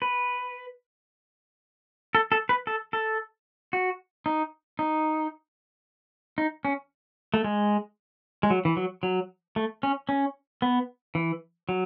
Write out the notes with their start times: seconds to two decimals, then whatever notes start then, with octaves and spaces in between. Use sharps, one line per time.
0.02 B4
2.15 A4
2.32 A4
2.49 B4
2.67 A4
2.93 A4
3.73 F#4
4.26 D#4
4.79 D#4
6.38 D#4
6.65 C#4
7.34 A3
7.44 G#3
8.43 G#3
8.50 F#3
8.65 E3
8.77 F#3
9.03 F#3
9.56 A3
9.83 C#4
10.09 C#4
10.62 B3
11.15 E3
11.69 F#3